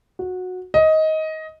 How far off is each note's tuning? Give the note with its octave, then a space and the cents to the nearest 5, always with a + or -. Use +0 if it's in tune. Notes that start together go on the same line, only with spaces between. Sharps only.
F#4 -15
D#5 +15